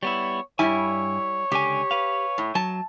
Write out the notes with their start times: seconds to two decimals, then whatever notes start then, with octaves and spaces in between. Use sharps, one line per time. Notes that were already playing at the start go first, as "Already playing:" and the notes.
0.03 G3 B3 E4 C#5
0.59 G2 G3 E4 C#5 G#5
1.52 C#2 D3 G4 G#5
1.91 B4 F5
2.38 A2
2.55 F#3 A5